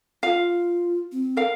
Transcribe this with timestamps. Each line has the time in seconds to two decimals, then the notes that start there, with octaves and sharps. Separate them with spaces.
0.23 F4 F5
1.12 C4
1.37 A#4 F5